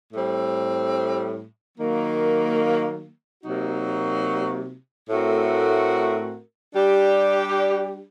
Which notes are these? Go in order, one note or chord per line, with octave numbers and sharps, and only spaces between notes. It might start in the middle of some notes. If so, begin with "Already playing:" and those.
A2 G3 C4
D#3 F#3 A#3
C3 F#3 A#3 D#4 F#4
A2 A3 C4 F#4 A#4
G3 D4 G4